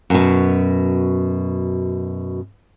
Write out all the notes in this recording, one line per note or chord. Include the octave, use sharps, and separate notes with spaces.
F#2 B2